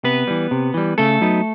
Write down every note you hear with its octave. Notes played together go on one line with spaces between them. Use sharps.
C3 B3 B4
E3 G3
C3
E3 G3
C#3 A3 A4
F#3 B3 D#4